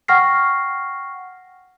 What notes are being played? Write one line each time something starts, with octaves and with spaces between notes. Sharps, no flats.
F#5 G5 C#6 F6 A#6 C7